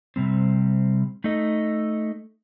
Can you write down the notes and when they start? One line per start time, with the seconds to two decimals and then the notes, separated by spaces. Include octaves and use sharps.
0.16 C3 G3 C4
1.24 A3 D#4 A4 D#5